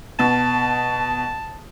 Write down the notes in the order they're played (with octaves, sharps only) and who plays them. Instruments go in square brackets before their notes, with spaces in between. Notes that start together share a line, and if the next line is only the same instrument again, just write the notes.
[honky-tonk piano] B2 [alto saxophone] A5